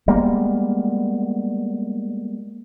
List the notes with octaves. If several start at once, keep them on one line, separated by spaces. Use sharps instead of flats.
G3 G#3 A#3 B3